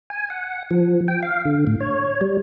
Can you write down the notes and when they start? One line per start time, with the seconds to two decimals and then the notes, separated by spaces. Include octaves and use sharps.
0.10 G#5
0.30 F#5
0.71 F3
1.08 G5
1.23 F5
1.45 D3
1.67 A2
1.80 C#5
2.21 G3